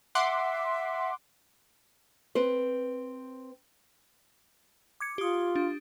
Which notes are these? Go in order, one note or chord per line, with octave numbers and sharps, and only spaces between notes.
E5 F#5 C6 D6
C4 B4 C5
D6 G#6 C#7
F4 G4 D#6
D4